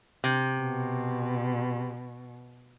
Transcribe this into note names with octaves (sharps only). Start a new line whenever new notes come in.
C3
B2